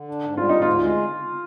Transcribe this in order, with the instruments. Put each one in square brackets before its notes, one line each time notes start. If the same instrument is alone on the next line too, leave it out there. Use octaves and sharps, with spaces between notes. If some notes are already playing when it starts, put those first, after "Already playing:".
Already playing: [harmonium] D3
D4
G#2
[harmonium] G3 [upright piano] F4
[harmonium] G#2 [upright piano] D#4
[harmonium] D2 [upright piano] F4
[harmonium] G#3